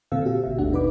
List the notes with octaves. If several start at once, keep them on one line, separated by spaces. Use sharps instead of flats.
A#2 D3 C4 A4 F5 E6
F#4 G4 F5
G#1 B2 E5
D#2 A3 D4 F#5
G1 B2 D#4 B4 B5 D6